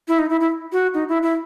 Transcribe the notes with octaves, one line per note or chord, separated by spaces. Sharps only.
E4
D#4
E4
E4
F#4
D#4
E4
E4